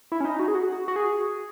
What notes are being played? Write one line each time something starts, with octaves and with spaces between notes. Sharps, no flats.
E4
C#4
D#4
F#4
G#4
F#4
F#4
G#4